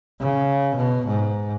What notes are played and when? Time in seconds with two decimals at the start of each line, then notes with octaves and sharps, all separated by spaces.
0.20 C#3
0.76 B2
1.07 G#2